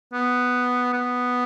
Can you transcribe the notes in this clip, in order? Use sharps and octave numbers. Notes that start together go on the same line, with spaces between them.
B3
B3